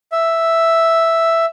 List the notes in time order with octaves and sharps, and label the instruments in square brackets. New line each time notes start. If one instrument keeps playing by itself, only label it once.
[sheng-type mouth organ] E5